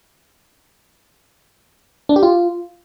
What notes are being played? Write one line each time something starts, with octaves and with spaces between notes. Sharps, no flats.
D4
G4
F4